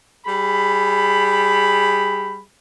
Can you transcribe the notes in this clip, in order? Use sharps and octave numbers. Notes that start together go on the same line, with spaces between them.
G3 G#4 B5